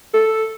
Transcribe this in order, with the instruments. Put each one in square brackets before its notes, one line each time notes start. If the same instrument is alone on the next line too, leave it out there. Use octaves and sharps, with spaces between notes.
[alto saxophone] A4